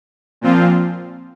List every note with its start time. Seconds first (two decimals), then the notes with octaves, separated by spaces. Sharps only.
0.41 A#2 F3 C4 F4